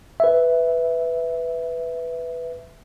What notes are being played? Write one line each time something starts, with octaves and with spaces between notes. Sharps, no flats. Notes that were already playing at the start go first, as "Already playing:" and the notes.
B4 E5